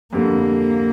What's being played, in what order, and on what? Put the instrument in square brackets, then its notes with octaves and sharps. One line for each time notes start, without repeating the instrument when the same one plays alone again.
[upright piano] F2 D3 G3 [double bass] A#3